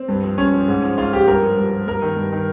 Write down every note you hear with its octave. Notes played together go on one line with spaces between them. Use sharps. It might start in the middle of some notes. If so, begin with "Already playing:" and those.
Already playing: C4
G2
F3
G2 C#4
F3
G#2
F3
G#2 F4
F3 G4
G2 A#4
F3
G2
F3
G2 A#4
D#3
G2
D#3